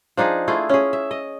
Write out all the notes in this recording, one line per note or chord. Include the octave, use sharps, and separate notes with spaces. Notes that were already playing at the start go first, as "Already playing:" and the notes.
F3 D4 D#4 G#4
A3 E4 F4 G#4
C#4 G#4
E5
D#5